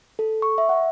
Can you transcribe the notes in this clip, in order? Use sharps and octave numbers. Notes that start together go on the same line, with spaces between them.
A4
C#6
E5
F#5